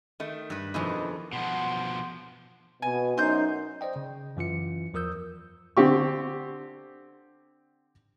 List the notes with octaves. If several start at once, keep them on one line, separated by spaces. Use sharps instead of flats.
D#3 A3
G2 B4
F2 B2 D#3 E3 G#4
B2 F3 F#5 C6
B2 G#5
F#2 D#4 C5 G6
C5 D5 D#5 G5
C#3
F#2 E3 F4 C#7
E2 F3 A#4 D#6 E6 G6
D3 C4 G4 C#6